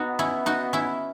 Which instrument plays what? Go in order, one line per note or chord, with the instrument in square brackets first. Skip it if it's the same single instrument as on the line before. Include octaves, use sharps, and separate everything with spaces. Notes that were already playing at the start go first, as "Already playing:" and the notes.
Already playing: [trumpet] B3 [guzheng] D#4 F#4
[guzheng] C#4 E4
D#4 F#4
C#4 E4